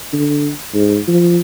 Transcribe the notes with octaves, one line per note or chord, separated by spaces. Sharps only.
D3
G#2
F3